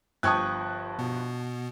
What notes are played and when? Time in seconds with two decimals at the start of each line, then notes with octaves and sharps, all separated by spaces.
0.23 G1 F3 G5 A5 C#6 D#6 F#6 G#6
0.99 B2 B3